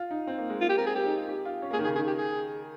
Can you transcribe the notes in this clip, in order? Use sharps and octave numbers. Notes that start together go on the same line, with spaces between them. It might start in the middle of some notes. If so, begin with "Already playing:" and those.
Already playing: F4
D#4
C4
A#3
G#3
A#3 F4
G4
C4 A#4
G#4
C4 G4
D#4
F4
G4
F4
C#4
A#3
G#4
D#3
G#4
C#3
D#3 G#4
G4
G#4